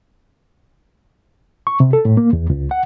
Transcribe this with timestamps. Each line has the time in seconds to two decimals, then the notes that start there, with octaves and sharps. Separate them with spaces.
1.67 C#6
1.80 C3
1.93 A4
2.05 A2
2.17 A#3
2.33 E2
2.50 C#2
2.71 F#5